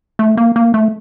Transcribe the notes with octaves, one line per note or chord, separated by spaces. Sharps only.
A3
A#3
A#3
A3